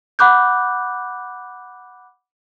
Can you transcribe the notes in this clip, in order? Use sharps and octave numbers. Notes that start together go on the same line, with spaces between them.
F#5 B5 D6 F#6 G6